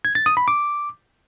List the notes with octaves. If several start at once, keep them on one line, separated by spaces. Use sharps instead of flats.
G#6
A6
D#6
B5
D6